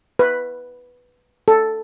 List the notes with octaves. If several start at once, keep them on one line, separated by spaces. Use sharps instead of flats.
B4
A4